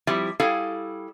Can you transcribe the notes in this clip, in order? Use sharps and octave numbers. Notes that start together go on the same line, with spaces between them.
F3 G3 C4 E4
G3 E4 G#4 A4 F5